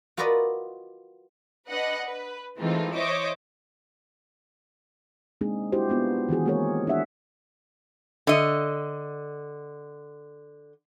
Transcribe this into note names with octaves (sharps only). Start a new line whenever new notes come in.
F4 F#4 A#4 B4 D5 D#5
D4 B4 D#5 F#5
B4
E3 G#3 A3 C4 D#4 F4
C5 C#5 D#5 E5 D6
G#3 A#3 C4 D4 D#4 G#4
D4 E4 F#4 G4 C5
B3 D4 F4
D#3 E3 F#4 G#4
G#3 A#3 C4 G#4 A#4 C#5
B3 D4 G4 E5 F#5
D3 D#5